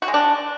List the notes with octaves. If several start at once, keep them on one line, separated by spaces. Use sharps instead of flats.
F#4
G#3
D4